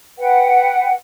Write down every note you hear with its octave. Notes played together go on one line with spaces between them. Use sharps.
B4 F#5 G5